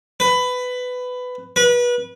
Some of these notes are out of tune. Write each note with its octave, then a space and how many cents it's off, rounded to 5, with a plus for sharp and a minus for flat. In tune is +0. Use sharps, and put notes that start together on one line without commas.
B4 +15
B4 -30